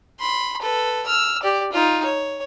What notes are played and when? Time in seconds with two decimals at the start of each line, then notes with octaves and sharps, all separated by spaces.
0.19 B5 C6
0.61 A4 B4
1.06 E6 F6
1.43 G4 D5
1.72 D#4 F4
2.04 C#5